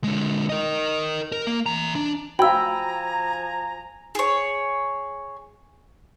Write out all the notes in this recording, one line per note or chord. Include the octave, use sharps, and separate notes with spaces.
D3 G#3
A#4 D#5
A#4
A#3
E3 A#5
D4
F3 F#4 F5 G5 G#5 A#5 B5 E6
G#4 C#5